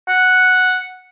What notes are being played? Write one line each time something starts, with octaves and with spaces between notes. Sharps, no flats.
F#5